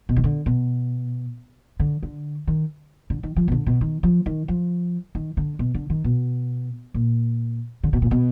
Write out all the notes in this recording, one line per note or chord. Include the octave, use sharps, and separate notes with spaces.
B2
D#3
D3
B2
D3
D3
D#3
D3
D#3
F3
B2
D3
B2
D#3
F3
D#3
F3
D#3
D3
B2
D3
D#3
B2
A#2
D3
B2
A#2
B2